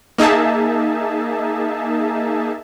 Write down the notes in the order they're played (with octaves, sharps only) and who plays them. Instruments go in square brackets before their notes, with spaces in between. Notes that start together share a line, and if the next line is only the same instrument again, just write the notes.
[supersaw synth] A#3 D#4 G#4 E5 A5